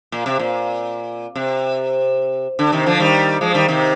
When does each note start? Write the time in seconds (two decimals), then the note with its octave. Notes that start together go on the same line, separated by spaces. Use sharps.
0.12 A#2
0.26 C3
0.39 A#2
1.35 C3
2.59 D3
2.72 C3 D#3
2.86 D3 F3
3.00 D#3 G3
3.41 F3 G#3
3.54 D#3 G3
3.68 C3 D#3